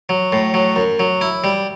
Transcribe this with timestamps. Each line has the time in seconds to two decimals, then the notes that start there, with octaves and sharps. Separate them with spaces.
0.09 F#3
0.32 A2
0.54 F#3
0.76 F#2
0.99 F#3
1.21 E4
1.44 G3